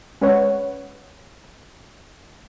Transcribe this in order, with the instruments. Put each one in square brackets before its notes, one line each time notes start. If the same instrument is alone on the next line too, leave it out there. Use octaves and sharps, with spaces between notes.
[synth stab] G#3 C#4 B4 C#5 F#5